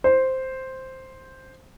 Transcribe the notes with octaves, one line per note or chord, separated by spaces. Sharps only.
C5